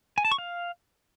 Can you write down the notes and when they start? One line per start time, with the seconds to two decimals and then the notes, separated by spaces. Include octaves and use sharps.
0.18 G#5
0.25 A5
0.31 C#6
0.38 F5